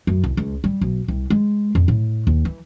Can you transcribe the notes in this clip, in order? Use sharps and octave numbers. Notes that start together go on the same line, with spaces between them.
F#2
C2
C#2
G3
B1
C2
G#3
F2
A2
D#2
E3